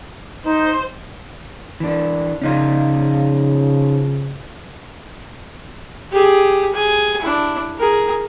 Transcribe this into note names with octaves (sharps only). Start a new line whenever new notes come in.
D#4 C5
E3 D4
C#3 F3 C#4 D#4 F4
G4 G#4
G#4 G#5
D4 E4
G#4 A#4